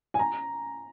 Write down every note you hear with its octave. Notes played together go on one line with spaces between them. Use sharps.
G#5
A#5